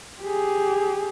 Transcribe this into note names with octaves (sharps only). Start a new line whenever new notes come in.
G4 G#4